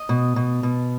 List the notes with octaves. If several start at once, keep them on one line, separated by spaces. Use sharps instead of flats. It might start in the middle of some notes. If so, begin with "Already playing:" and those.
Already playing: D#5
B2
B2
B2